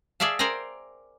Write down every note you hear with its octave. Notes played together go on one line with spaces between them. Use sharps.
G#4 D5 E5 F5 A5
A#4 C5 D5 G5 G#5 A#5